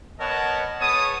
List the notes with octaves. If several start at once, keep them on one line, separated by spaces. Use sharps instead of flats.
B3 A#4 C#5 D#5 F#5 A5
B3 G#4 C#5 A5 D#6